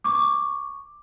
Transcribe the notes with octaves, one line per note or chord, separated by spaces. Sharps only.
C#6 D6